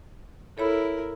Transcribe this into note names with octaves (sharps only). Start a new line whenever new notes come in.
E4 A4 A#4 C#5 B5